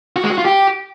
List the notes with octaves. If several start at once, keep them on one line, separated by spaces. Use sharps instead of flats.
F#4
G#3
F#4
F4
G4